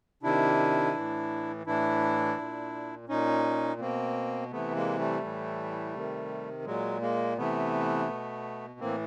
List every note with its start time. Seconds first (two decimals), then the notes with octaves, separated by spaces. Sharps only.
0.23 C3 D#3 D4 E4
0.95 A2 E3
1.66 A2 E3 D4 E4
2.38 A#2
3.08 A#2 C#4 D#4
3.80 B2 A#3 C4
4.51 C3 E3 A3 B3
4.75 G#3 A#3
4.99 G3 A3
5.23 A2 E3
5.94 C3 D#3
6.65 A#2 F#3 G#3
7.01 G#3 A#3
7.37 C3 E3 A3 B3
8.09 B2
8.80 A2 E3 A#3 C4